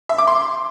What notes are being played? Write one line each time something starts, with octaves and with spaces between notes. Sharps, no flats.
E5
D6
C6